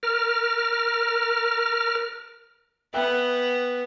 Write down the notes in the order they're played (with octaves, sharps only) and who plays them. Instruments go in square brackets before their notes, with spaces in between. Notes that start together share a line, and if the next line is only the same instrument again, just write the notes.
[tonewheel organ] A#4 F6
[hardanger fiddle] B3 [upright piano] E5 G5 F#6